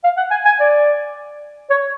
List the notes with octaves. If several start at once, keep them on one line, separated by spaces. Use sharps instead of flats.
F5
F#5
G#5
G#5
D5
C#5